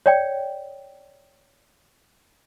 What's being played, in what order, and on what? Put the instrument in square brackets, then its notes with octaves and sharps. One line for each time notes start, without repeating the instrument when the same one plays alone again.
[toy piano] C#5 D5 G5